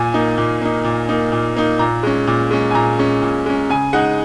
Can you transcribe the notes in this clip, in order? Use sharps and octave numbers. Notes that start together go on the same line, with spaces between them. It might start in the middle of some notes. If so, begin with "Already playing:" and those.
Already playing: A#2 G#5
A#3 D#4
A#2
A#3 D#4
A#2
A#3 D#4
A#2
A#3 D#4
A#2 A#5
G#3 C#4
A#2
G#3 C#4
G#5
A#2 A#5
G#3 C#4
A#2
G#3 C#4
C#3 G#5
G#3 D#4 F#5